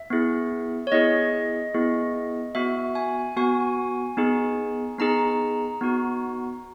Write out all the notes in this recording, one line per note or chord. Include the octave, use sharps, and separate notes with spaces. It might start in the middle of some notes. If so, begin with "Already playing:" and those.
Already playing: E5
B3 E4 G#4
C#5
B3 E4 G#4 D#5
B3 E4 G#4
B3 F#4 E5
G#5
B3 F#4 G#5
B3 D#4 G#4
B3 D#4 G#4 A#5
B3 D#4 F#4